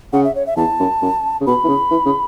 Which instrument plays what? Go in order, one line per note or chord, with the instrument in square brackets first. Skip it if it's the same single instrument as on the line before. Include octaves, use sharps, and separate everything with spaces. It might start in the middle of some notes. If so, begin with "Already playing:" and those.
[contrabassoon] C#3 [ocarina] F#5
[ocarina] E5
C#5
E5
[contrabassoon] E2 [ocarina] A5
[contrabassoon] F#2
F#2
C#3
[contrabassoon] B2 [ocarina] B5
[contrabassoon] E3
C#3
E3
C#3